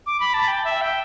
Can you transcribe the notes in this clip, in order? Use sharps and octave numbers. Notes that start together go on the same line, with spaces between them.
D6
B5
A5
G5
E5
G5